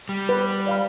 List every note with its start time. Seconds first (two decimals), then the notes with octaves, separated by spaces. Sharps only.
0.09 G3
0.29 B4
0.67 D5 F5 B5